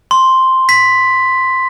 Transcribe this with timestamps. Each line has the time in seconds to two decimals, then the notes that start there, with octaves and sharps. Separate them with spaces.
0.11 C6
0.69 B6